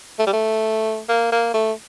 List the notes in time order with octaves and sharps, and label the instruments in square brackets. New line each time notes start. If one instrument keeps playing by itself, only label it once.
[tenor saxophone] A3
G3
A3
A#3
A#3
A3